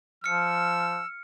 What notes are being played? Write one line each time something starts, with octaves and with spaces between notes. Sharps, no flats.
F3 E6 F6 C#7